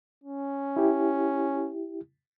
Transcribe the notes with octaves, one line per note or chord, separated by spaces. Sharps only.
C#4
E4 G4